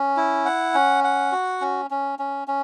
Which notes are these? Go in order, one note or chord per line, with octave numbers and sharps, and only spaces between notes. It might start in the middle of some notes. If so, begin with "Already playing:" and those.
Already playing: C#4
E4
F#5
C#4
F#5
F#4
C#4
C#4
C#4
C#4